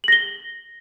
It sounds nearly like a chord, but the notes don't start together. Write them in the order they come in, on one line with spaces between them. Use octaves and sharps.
F#7 A#6 G7